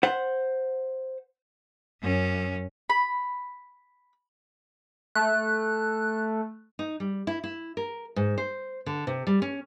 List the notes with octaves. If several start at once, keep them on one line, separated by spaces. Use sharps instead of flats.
C5 F#5
F#2 C#4
B5
A3 F#6
D#4
G3
E4
E4
A#4
G#2
C5
D3
C3
G3
C#4